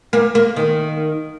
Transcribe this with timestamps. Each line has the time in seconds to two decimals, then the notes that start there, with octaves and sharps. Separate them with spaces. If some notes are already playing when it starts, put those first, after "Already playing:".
0.13 A#3
0.35 A#3
0.56 D#3